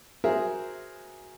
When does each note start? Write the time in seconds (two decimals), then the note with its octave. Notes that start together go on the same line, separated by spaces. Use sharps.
0.24 F#4 G#4 A#4 C5 E5